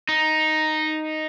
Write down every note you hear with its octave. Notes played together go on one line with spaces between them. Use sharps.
D#4